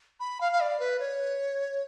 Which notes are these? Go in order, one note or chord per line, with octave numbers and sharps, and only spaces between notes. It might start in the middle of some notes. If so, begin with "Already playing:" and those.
B5
F5
F5
D5
B4
C#5